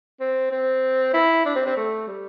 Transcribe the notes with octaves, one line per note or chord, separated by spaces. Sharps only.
C4
C4
E4
D4
C4
C4
A3
G3